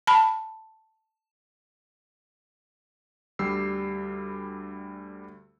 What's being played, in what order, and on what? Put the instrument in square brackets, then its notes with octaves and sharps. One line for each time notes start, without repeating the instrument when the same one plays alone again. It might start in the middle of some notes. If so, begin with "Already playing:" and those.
[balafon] A5 B5
[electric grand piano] D2 G3 G4 E6 C7